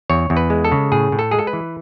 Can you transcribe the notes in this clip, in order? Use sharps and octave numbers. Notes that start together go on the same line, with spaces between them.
E2 C#5
E2
B4
G#3
A4
C#3
A2 G#4
A2
A4
G#3 G#4
A4
B4
E3